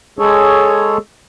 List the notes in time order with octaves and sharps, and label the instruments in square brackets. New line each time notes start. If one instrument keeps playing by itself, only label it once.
[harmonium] G#3 G#4 A4 C#5